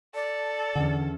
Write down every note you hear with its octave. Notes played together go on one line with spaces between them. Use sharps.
A4 D5
E2 D3 C#4 F#5